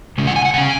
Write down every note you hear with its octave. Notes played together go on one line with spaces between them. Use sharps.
C#3 G#3 C#4
F#5
G#5
F#5
C#3 G#3 C#4 G#5